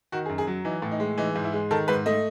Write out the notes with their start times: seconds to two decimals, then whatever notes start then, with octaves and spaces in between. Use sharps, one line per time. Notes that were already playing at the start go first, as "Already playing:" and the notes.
0.12 D#3 F#4
0.26 G#4
0.29 F#2
0.38 G#4
0.47 F#3
0.65 E3 D#4
0.82 A2
0.91 D#4
1.00 G#3
1.18 E3 D#4
1.36 G#2
1.44 E4
1.53 G#3
1.71 D#3 A4
1.88 G#2 B4
2.06 A3 D#5